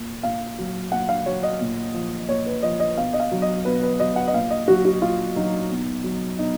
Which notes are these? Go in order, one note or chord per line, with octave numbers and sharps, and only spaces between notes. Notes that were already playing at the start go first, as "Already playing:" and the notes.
Already playing: A#2
A#2 F5
F#3
A#2 F#5
F5
F#3 C#5
D#5
A#2
F3
A#2 C#5
B4
F3 D#5
D#5
B2 F5
D#5
F5
F#3
D#5
B2 B4
B4
F#3 D#5
F#5
D#5
A#2 F5
D#5
F#3 F#4
F#4
A#2 F4
F#3 D#4
B2
F#3
B2 D#4